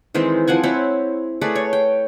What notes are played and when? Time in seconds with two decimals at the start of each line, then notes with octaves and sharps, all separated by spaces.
0.14 D#3 E3 G#3 C4
0.47 F3 C4 F#5 G#5
0.63 C4 E4 C#5
1.41 A3 G#4 B4 D5
1.55 C#5
1.73 G5